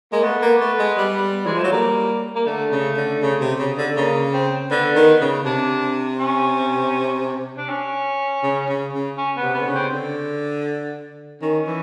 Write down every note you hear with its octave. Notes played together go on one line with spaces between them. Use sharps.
G#3 A#3
A3 B3
A#3
A3
G#3
G3
E3 G#3
F3
A3
F#3
G3 A#3
A#3
D3 A3
C#3
D3
C#3
C3
C#3
D3
C#3 A#3
C4
D3 B3
D#3
C#3
C3 D4
C#4
D4
C#4
C#3
C#3
C#3
C#4
B3
C3
B3
D3
C#3
C4
D3
D#3 C#4
E3